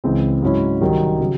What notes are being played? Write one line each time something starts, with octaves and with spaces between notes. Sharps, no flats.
C#2 C#3 E3 C4
G#2 F#3 C#4 E4
C2 C3 D#3 F#3
C#3 F#3